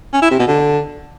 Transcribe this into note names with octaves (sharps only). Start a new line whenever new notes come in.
C#4
E4
C3
B2
D3